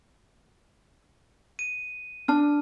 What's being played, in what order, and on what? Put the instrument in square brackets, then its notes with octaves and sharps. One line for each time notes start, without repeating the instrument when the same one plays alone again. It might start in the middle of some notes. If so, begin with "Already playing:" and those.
[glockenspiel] D#7
[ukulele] D4 [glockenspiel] A5 F6